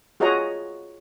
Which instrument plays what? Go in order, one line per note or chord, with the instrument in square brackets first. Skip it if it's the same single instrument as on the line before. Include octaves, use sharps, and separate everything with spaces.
[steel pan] F4 F#4 G#4 C#5 D#5 A#5